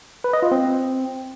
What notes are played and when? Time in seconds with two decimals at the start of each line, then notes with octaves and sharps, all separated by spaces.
0.24 B4
0.33 D#5
0.42 F4
0.52 C4